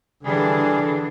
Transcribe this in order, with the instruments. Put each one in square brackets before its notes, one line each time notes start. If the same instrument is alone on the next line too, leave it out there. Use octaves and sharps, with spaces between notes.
[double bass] D3 [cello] E3 D4 [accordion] G3 G#4